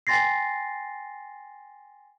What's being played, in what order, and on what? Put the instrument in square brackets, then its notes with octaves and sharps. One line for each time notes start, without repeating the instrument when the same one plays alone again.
[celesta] G5 G#5 C6 A6 A#6 C7